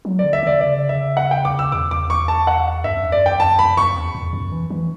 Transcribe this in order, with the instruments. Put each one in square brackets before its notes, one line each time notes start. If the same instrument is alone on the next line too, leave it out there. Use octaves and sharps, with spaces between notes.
[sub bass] F#3
[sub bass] D3 [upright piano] D5
[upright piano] E5
[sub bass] D3 [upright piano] D5
[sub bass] C#3 [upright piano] D5
[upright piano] E5
F#5
G5
D6
E6
[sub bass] E2 [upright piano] D6
[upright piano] D6
C#6
A5
F#5
[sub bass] G2 [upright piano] E5
[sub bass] F#2
E2
[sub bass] F#2 [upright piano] D5
[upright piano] G5
A5
B5
C#6
[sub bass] E2
E2
F#2
E3
E3